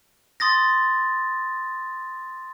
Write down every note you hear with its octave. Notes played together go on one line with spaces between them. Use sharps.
C6 D#6 A6 A#6